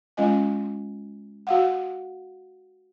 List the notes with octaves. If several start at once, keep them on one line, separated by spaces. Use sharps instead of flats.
G#3 C#4 F4 D#5 G#5
F#4 F5 F#5